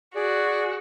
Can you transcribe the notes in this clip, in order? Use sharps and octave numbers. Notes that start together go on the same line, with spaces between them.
F#4 G#4 D5